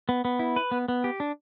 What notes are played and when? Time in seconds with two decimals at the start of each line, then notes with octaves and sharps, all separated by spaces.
0.09 B3
0.25 B3
0.39 E4
0.56 B4
0.71 B3
0.88 B3
1.04 G4
1.20 D4